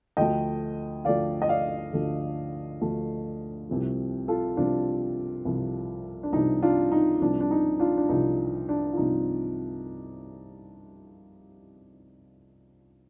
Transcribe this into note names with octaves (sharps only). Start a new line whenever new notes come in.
D2 D3 F3 A3 D#5 G5
D2 D3 F3 A3 D5 F5
D#5
D5 F5
D2 D3 F3 A3
D2 D3 F3 A3
C2 C3 F3
F4 A4
C2 C3 F3 D4 F4
C2 C3 F3
D4
C2 C3 F3 D#4
D4 F4
D#4
C2 C3 F3 D4
D4
D#4
D4 F4
D4
C2 C3 F3 D#4
D4
F4
C2 C3 F3 D#4